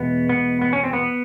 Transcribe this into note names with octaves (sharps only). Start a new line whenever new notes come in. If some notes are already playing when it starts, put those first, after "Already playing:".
Already playing: E2 B2 G#3 B3
B3
B3
C#4
C4
B3